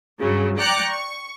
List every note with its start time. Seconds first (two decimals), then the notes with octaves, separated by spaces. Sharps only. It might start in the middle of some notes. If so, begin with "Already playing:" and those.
0.21 G2 C#3 F#3
0.58 D5 G5 A#5 D6 F#6 C#7
0.90 C#6